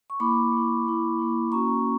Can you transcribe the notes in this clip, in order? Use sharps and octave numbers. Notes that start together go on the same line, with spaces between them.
C#6
A#3 E4 B5 D6
A#3 E4
A#3 E4
A#3 E4
A#3 C#4 F#4 A#5 C#6